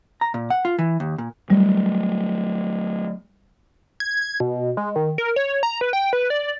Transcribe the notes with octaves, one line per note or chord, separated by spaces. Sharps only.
A#5
A#2
F#5
F4
E3
D#2
A#2
F#3 G3 A3
G#6
G#6
B2
G#3
D#3
A#4
C#5
A#5
B4
G5
B4
D5